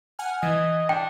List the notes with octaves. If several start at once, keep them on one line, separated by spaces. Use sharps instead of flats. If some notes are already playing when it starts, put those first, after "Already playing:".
F#5 G#5 F6
E3 D#5 G#6
D4 G5